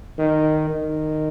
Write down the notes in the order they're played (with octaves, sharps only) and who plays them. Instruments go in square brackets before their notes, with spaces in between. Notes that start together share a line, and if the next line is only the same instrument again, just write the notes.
[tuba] D#3
D#3